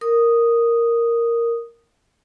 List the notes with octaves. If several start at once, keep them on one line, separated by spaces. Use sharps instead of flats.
A#4 D#6